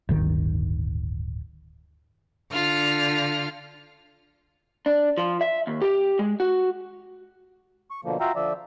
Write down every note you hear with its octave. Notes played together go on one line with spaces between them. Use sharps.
D1 G1 D#3
D3 F4 F6
D4
F3
E5
D#2
G4
G#3
F#4
C#6
B2 D3 F3 A#3
F4 F#4 E5 F5 G5 A#5
D3 F3 D5 E5